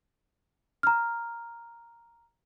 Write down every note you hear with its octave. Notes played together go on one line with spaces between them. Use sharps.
A#5 F6